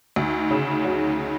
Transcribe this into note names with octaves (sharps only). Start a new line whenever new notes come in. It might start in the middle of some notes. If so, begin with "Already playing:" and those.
D2 D#4
C#3
F#3